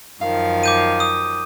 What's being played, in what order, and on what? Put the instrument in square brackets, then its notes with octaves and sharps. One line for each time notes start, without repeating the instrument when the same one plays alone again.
[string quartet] F#2 D#3 F3 [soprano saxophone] F5
[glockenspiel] D6 G6 D#7
D#6